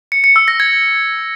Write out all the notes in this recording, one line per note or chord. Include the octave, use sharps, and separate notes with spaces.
C#7
C#7
E6
A#6
G#6